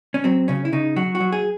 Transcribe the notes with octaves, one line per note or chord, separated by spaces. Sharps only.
C#4
F#3 C4
C#3 C#4
E4
C#3 D#4
F#3 F#4
F#4
F#3
G#4